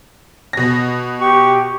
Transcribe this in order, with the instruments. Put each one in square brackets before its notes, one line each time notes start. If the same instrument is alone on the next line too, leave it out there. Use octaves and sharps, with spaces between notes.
[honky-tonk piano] B2 A#6
[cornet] G4 [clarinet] C#6